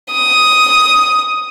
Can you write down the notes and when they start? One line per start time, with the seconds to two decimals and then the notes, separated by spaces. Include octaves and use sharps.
0.12 D#6